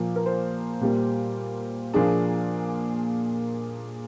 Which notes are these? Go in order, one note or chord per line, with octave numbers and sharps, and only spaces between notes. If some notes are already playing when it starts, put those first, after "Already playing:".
Already playing: A#2 F3 A#3
A#4
C5
A#2 G3 A#3
A#2 F3 A#3 D4 G#4